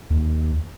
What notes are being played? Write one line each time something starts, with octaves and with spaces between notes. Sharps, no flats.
D#2